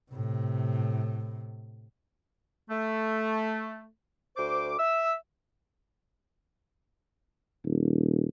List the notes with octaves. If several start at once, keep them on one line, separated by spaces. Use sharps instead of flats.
A2 C3
A3
D2 C5 D6
E5 E6
D#1